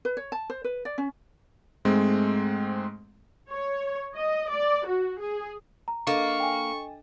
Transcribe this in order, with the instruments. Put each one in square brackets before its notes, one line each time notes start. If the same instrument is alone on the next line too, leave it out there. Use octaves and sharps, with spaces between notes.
[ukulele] B4
C#5
A5
C5
B4
D5
C#4
[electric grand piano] G#2 G#3 A3 C4
[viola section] C#5
D#5
D5
F#4
G#4
[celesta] A#5
[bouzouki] A#3 [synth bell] D4 A4 D#5 [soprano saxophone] C#6
[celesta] G5 G#5